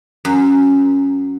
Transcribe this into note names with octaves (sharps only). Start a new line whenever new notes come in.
F#2